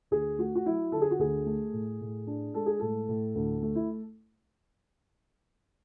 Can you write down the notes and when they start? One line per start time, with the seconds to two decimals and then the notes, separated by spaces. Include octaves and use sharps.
0.11 D2 G#4
0.38 A3 F#4
0.55 F#4
0.66 F#3 E4
0.92 D3 A4
1.01 G#4
1.11 F#4
1.19 D2 G#4
1.46 A3
1.73 A2
2.01 A2
2.27 D4
2.54 G#3 A4
2.66 G#4
2.79 A2 A4
3.09 A2
3.35 D2
3.62 A3
3.75 E4